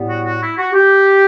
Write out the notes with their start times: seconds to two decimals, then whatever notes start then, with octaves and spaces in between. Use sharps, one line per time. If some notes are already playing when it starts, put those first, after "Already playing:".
Already playing: A2 G3 B3
0.09 F#4
0.24 F#4
0.41 E4
0.57 F#4
0.73 G4